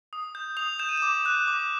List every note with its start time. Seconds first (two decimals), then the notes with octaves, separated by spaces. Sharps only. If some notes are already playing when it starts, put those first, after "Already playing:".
0.13 D#6
0.35 G6
0.57 D#6 F7
0.79 G6 E7
0.89 D#7
0.97 D6 E7
1.26 F#6
1.47 D6